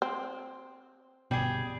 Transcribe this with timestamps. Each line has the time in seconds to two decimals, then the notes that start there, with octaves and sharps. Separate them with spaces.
0.02 C4
1.31 G1 B2 G3 G#4